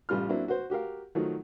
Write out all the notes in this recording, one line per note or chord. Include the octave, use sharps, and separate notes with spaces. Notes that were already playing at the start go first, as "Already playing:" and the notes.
A1 G3 F4 F6
F#3 A#3 C4 D4 E4
F#4 C5
F#4 G4 A#4 F5
D#3 F3 F#3 A3